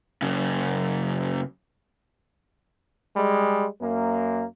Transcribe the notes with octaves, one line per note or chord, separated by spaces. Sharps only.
F#2 C#3
G3 G#3
F#2 A#3